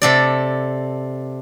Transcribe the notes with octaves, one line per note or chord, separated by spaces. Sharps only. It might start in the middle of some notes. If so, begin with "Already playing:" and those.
C3 A4 D5